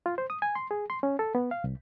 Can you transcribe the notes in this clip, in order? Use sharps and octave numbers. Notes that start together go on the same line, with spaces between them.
F4
C5
D#6
G#5
C6
G#4
C6
C#4
A4
B3
F5
C2